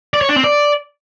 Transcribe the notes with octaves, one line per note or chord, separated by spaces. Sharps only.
D5
C#5
D4
C4
D5